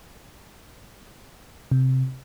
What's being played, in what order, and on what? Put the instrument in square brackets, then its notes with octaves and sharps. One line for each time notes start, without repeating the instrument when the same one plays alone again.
[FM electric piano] C3